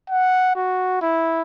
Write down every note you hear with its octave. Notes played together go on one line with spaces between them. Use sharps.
F#5
F#4
E4